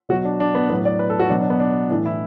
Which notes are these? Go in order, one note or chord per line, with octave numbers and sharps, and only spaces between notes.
B2 F#3 F#4
D4
D4
B3
A2 F#3 B3
D5
B4
A4
F#4
B2 F#3 D4
D4
B3
D4
A2 E3 D4
E4